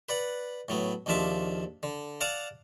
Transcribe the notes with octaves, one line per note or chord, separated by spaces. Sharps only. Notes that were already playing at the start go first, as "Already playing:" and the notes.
B4 D5 F#5
A2 F#3 B3
A#1 D#2 F3 D4 E5 D6
D3
D5 F5 F#5 A5 D6 D#6